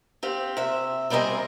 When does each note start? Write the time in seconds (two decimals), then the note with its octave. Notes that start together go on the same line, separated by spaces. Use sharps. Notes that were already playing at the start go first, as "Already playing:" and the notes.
0.23 C4 G4 F5
0.57 C3 E5
1.10 E2 G3 C4 A#4 D#5 G#5